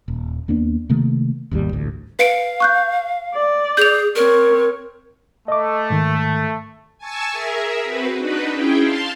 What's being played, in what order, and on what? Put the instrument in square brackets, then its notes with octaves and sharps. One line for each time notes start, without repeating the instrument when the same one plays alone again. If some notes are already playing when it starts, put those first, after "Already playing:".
[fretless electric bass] D#1
D#2 A#3 B3 D4
C3 D#3 A3 A#3
G#1 D#2 D3 G3
A1 D2
[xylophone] B4 C#7 D7 [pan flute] F5
[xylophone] C#6 F#6 G6
[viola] D5
[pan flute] G#4 [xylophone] G6 F7
[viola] C4 C#5 [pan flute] A#4
[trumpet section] A3 [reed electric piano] D#5 D6
[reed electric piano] G#2 D#3
[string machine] G#5 A5 C#6 E6
G#4 A#4 E5
C4 F#4 B4
D4 D#4 F#4 B4
C#4 E4 G#4 G5
F5 A5 C6